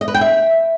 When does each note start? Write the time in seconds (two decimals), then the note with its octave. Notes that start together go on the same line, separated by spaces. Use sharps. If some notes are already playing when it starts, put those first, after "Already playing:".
0.01 D#5
0.08 B4
0.14 G5
0.21 E5